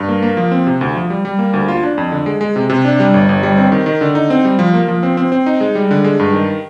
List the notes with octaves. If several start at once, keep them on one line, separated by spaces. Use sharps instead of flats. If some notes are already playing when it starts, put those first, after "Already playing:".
Already playing: G2
A#3
A#3
F3
C4
C3
D2
F3
G3
G3
A#3
D2
F4
D4
F2
D3
G#3
G#3
C3
C3
D4
G3
G1
G1
G3
C4
D#3
D#3
D3
D#4
C4
G3
F3
A#3
F3
C4
C4
C4
D#4
G#3
G3
D3
G#3
G2
D#3